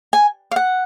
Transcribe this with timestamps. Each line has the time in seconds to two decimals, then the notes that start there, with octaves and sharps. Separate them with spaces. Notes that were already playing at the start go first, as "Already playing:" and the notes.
0.13 G#5
0.51 F5
0.56 F#5